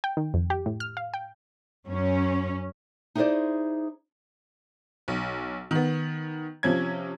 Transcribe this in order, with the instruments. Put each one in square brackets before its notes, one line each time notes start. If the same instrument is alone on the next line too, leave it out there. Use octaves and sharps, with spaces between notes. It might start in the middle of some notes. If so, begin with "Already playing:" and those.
[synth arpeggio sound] G5
D#3
F2
G4
A2
F6
F5
G5
[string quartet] F#2 [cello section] C#4
[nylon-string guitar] D#4 E4 G#4 A#4 C5 D5
[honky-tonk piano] B1
D#3 B3
C3 F3 C#4 G#6